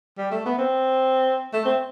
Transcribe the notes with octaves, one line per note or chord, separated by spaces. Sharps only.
G3
A3
B3
C4
A3
C4